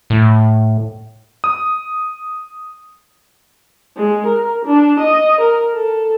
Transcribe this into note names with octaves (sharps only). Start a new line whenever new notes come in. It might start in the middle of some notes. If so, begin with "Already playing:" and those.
A2
D#6
G#3
A#4
D4
D#5
A#4
A4